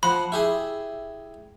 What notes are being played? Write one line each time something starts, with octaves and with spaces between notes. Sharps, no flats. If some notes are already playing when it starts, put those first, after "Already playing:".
F3 F#5 B5
E4 G4 G#4